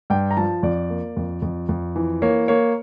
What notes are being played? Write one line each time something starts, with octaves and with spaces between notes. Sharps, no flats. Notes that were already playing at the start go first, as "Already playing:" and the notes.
G2 G5
A#5
F3 A5
F2 D5
A#3
F2
F2
F2
E3
A#3 C#5
A#3 C#5